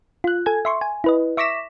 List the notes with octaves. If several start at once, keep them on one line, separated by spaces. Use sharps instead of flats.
F4 F#6
A4 G#5 G#6
E5 C6 C#6
G#5
E4 B4 D#5
E5 C#6 D6 A#6 B6 E7